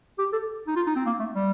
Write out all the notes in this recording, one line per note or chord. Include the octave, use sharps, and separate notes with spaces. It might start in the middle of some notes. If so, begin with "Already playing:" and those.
G4
A4
D#4
F4
D#4
C4
A#3
A3
G3